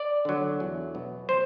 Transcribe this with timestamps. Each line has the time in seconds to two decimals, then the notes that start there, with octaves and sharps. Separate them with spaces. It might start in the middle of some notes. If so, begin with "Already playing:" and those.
Already playing: D5
0.25 D3 F#3
0.60 E2
0.95 B2 F#3
1.29 C5